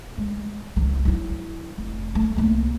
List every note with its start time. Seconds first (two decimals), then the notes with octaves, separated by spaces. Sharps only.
0.18 G#3
0.76 C#2 E3
1.05 F#3 E4
1.78 F1
2.15 A3
2.36 C2 A#3